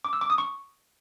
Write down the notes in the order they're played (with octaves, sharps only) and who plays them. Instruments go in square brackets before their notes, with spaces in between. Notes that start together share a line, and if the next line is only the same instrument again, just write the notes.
[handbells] D6
E6
D6
D#6
C#6